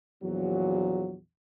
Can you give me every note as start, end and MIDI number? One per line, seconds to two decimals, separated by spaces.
0.23 1.16 34
0.23 1.16 40
0.23 1.16 46
0.23 1.16 53
0.23 1.16 54